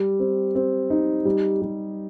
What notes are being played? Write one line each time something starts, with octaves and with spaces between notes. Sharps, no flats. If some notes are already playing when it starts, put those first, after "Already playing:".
Already playing: G3
C4
C4
D#4
G3
G3